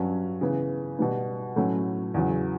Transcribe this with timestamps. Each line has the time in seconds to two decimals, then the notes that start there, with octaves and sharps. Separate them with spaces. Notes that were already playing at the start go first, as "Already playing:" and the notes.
Already playing: G2 F#3 C#4
0.41 C#3 E3 B3
0.99 B2 G3 B3
1.56 A2 F#3 A3 C#4
2.14 E2 C#3 F#3